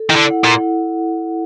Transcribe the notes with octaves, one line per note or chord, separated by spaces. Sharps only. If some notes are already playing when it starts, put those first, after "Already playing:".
Already playing: A4
D#3 E4
D3
F#5
A#2
E4